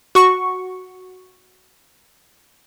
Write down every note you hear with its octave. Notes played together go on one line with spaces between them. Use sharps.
F#4 C#6